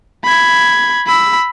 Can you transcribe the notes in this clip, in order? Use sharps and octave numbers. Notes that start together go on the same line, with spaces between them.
B5 G#6
B5 E6